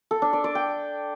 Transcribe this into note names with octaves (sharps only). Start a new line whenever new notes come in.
A4
D4
D5
D5
G5